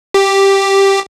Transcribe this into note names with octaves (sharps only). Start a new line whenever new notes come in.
G4